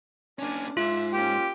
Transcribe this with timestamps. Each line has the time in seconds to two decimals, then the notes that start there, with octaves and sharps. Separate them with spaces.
0.39 A#3 C#4 D4 G#5
0.77 G#2 F4 E5
1.13 A#3 C#4 G4